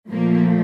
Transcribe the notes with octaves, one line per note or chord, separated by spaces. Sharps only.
A#2 F3 A3 A#3